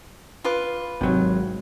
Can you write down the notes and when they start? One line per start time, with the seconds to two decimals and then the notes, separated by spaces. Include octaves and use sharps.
0.44 F4 B4 D6
1.01 G#1 C3 F#3